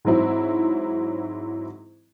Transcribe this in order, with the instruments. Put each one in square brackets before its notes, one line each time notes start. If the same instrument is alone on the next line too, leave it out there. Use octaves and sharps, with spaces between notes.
[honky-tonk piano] G#2 E3 F#3 C4 E4